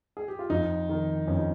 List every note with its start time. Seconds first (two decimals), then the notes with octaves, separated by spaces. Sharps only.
0.17 G#4
0.28 G4
0.39 F4
0.50 F2 D#4
0.89 D#3
1.28 F2 C#4
1.37 D#4